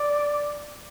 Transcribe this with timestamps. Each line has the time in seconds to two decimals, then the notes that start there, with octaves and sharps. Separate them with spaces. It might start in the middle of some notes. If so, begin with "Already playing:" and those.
Already playing: D5